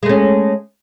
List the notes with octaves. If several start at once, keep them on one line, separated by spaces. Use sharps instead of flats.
G#3 A3 C#4